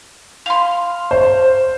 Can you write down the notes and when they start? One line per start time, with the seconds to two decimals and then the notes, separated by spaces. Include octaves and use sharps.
0.46 F5 C6
1.11 C5